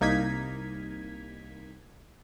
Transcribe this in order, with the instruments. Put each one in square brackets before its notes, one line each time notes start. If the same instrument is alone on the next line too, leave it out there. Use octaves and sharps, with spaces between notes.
[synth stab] C2 A#3 D#4 G#6 B6